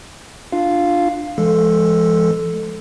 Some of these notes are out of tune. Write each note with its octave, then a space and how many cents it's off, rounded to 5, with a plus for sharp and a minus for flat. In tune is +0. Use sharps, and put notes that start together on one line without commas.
D4 +10 F4 +0 F5 +0
F3 -45 G#3 +0 A4 +0